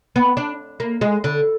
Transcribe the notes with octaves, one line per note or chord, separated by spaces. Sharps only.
B3
D4
A#3
G#3
D3